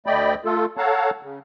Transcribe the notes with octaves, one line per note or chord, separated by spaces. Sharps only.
D2 A3 D5 D#5 G5 B5
A3 F4 A4
A4 C#5 F5 F#5 A5 A#5
C#3